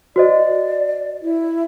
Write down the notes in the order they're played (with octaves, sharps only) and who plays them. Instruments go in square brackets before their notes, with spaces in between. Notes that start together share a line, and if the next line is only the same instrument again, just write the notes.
[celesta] F#4 C5 D#5 [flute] D5
[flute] E4